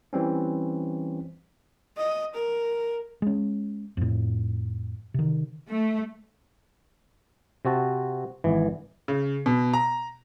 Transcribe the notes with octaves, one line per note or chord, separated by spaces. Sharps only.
E3 G3 C4 C#4
D#5
A#4
G#3 C#4
F2 A2
C3 D#3
A3
C3 C4 F#4 A5
G#1 E3
C#3
B2
A#5